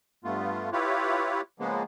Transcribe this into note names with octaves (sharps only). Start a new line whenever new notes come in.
G2 A3 B3 F4
E4 F4 G4 B4 C#5
C#3 F3 G#3 A#3 B3